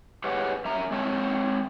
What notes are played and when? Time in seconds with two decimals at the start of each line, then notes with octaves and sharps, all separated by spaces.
0.24 G4 G#4 B4 C#5 D#5 F#5
0.65 F#2 E5 A#5
0.91 G#3 C4 C#5 F#5 A5